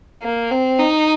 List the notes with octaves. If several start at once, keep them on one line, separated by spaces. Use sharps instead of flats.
A#3
C4
D#4